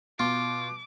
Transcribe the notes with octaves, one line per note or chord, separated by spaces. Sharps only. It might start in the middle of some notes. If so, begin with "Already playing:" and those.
B2 F4 D6